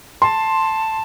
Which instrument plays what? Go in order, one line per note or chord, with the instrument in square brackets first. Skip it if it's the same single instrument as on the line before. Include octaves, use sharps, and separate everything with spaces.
[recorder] A5 [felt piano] C6